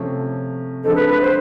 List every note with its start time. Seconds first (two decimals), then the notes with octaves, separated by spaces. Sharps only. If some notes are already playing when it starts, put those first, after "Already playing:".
Already playing: C3 F3 A3 C#4
0.84 D3 F3 G#3 C4 D#4 A4
0.96 B4
1.09 B4
1.21 C5